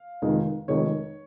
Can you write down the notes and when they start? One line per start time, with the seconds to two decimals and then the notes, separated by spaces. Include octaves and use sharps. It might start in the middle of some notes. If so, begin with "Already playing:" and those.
Already playing: F5
0.22 F1 F2 D#3 G#3 D#4
0.68 F1 F2 D#3 G#3 D#4 C#5